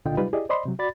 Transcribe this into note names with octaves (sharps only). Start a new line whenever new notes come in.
C2 A#2 D3 F4 D#5 G5
C3 F#3 G3 D#4 F4 B4
E4 G4 G#4 D5 D#5
C5 D5 D#5 B5 C6
C3 F#3
F#4 D5 B5 A6